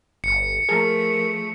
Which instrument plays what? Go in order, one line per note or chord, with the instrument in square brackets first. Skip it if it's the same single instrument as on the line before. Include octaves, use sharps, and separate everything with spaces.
[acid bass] G1 [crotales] C#7
[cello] F3 A3 [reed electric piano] G#4 A5 [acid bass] A#4